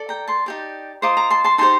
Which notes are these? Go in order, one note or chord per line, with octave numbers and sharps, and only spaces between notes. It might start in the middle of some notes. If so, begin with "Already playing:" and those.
Already playing: A4 D5
G5 A#5
A5 C6
D#4 G4 D5
F4 C5 D#5 A#5 D6
A#5 D6
A5 C6
A5 C6
D#4 G4 C5 A5 C6